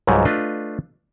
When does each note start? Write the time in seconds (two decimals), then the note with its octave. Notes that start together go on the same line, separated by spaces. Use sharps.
0.07 C#2 G#2 F#3 G3
0.25 A3 D4 F4 B4 D#5